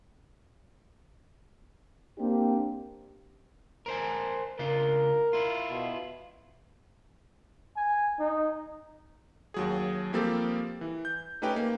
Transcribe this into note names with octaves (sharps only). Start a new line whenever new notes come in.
A#3 C4 D4 G4
A#4 C5 G#5
C#3 D4 F4 A#4
E4 F4
B2
G#5
D#4
D#2 F#3 G#4
F3 G3 A#3 C4 G4 A4
E3
G6
A3 C#4 D#4 G4 B4 G5
A#3